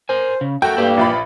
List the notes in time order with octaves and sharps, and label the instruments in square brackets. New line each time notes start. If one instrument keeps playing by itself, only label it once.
[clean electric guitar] A#4 G#5 [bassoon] C5
[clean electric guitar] C#3
[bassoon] A3 [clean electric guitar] F#4 A#4 [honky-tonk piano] G5
[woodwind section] G2 A#3 [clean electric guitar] E4 G4
[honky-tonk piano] A#1 F4 B5 [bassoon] E3